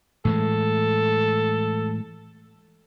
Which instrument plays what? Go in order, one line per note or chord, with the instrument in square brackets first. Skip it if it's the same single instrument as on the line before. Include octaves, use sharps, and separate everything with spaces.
[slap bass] A2 E3 G#3 [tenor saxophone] A4